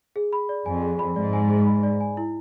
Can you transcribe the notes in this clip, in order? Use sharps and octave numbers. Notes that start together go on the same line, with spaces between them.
G#4
B5
D5
F2 G#5
G#4
B5
G#2 D5
G#5
G#4
B5
D5
G#5
E4